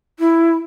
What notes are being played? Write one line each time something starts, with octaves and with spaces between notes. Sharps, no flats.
E4